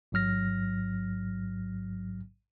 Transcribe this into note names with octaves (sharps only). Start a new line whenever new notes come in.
A1 G#2 F#3 F6 A#6